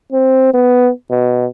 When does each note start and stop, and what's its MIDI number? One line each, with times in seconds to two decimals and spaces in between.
0.12 0.53 60
0.54 0.90 59
1.11 1.46 47